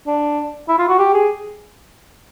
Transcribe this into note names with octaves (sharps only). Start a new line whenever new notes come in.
D4
E4
F4
F#4
G4
G#4